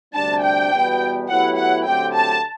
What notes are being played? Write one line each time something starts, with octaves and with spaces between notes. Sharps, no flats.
D2 C3 G3 D4 A5
G5
E2 B2 G3 B3 F#4
A2 F#3 B3 E4 G4 F#5
F#5
D3 F#3 A3 C4 G4 G5
A5